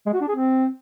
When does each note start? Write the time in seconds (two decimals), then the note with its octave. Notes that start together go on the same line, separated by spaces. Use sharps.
0.06 G#3
0.14 F#4
0.21 D4
0.28 G#4
0.35 C4